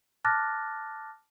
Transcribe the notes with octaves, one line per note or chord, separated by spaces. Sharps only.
A5 D6 F6 F#6 A6 A#6